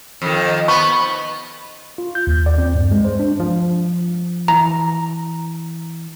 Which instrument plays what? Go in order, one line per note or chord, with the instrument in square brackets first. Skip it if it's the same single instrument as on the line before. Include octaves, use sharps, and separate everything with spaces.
[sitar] F2 D#3
[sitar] B3 [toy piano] C#6
[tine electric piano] F4
G6
D#2
D5
C4
G2
G#3
C5
D4
[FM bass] F3
[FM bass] E3 [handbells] A#5